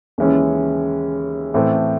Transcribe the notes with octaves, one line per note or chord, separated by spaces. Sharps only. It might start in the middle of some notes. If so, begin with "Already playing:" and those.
D#2 C#3 E3 G#3 C#4
A2 E3 A3 C4